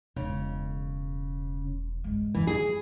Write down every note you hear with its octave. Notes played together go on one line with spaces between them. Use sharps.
E1 C#3 E4
G2 G#3
D3 E3
G#4